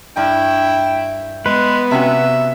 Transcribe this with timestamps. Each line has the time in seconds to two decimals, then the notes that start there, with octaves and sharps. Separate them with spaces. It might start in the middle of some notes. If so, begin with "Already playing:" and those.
0.17 G2 E4 G5
1.46 G#3 B3 B4
1.91 C3 C#4 F#4 E5